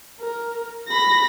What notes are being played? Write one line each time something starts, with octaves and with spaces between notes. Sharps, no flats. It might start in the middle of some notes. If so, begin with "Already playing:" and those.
A#4
B5 A#6